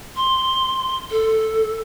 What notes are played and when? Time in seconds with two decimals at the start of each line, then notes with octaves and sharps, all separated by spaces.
0.16 C6
1.11 A4